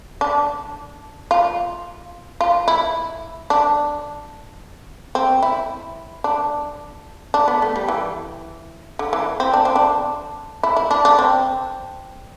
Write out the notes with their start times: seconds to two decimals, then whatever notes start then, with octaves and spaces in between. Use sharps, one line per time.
0.21 D4
1.31 F4
2.41 F4
2.68 E4
3.50 D4
5.15 C4
5.43 E4
6.24 D4
7.34 D4
7.48 B3
7.62 A3
7.76 G3
7.88 E3
8.99 D3
9.13 E3
9.40 C4
9.53 D4
9.65 C4
9.76 D4
10.63 E4
10.77 E4
10.91 D4
11.05 D4
11.19 C4